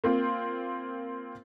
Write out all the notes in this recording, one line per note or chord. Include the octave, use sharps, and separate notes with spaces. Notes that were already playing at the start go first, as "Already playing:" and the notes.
A#3 C4 F4